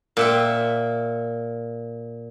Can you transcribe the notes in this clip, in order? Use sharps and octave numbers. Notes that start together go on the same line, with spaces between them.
A#2 E5 G5